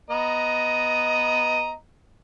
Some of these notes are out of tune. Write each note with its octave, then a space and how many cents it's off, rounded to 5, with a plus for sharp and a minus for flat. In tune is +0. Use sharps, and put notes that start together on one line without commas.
B3 +0 D#5 +10 A#5 +0